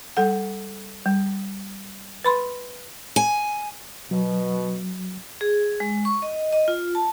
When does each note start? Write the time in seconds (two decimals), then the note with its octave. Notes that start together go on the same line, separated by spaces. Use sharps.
0.17 G3 A4 F#5
1.06 G3
2.24 B4 B5 C6
3.16 G#5
4.11 B2 F#3
5.41 G#4
5.80 G#3
6.05 C#6
6.22 D#5
6.53 D#5
6.68 F4
6.95 A5